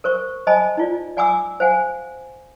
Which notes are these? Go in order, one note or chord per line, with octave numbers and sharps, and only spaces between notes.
A#4 C5 C#6
C5 D#5 G#5 A5 B5
D#4 F4 D5
D5 F#5 G#5 B5 D6 E6
C5 F5 F#5 G#5